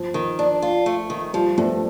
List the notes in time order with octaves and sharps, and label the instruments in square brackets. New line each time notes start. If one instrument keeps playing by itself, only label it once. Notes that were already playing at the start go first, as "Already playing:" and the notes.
Already playing: [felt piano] F3
[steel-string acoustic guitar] D#3
D4
F4
A3
D#3
[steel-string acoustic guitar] F3 [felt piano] G3
[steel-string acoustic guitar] G2 [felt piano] F3 A3